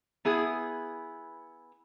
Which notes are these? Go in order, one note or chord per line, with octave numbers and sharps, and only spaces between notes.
B3 E4 G#4